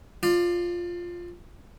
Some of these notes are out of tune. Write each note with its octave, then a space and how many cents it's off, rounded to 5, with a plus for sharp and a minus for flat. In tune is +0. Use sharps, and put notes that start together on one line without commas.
F4 +0 D5 +25